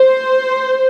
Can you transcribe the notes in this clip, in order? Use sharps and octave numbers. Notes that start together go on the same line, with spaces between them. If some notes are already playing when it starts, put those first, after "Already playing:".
Already playing: C5